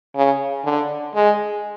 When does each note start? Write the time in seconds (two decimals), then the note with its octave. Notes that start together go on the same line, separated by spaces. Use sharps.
0.16 C#3
0.65 D3
1.15 G#3